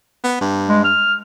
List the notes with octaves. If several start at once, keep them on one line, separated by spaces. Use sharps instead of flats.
B3
G2
G#3
F6